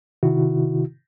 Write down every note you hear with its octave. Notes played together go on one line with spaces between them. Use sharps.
C3 D#3 E4 F#4